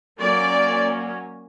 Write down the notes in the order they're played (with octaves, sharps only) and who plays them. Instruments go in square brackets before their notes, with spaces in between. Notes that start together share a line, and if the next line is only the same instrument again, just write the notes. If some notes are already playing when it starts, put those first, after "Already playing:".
[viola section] F#3 A#3 C#4 D5